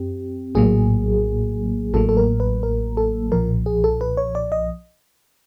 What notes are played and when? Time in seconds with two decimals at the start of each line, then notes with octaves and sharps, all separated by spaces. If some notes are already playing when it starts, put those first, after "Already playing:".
Already playing: F#2 C4 G4
0.55 A#1 A2 F#3 A#3 G#4
1.94 A1 A2 F#3 A#3 A4
2.09 A4
2.17 A#4
2.40 B4
2.63 A#4
2.97 A4
3.32 B1 A#2 F3 A#4
3.66 G#4
3.84 A4
4.01 B4
4.17 C#5
4.35 D5
4.52 D#5